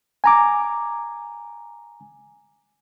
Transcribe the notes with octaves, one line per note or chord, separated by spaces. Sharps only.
G#5 A#5 D6